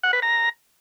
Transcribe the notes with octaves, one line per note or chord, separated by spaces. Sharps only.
F#5
B4
A#5